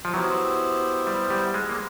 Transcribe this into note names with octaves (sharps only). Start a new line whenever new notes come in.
F3
F#3 B3 E4 G4 C5
G3
G3
G#3
A#3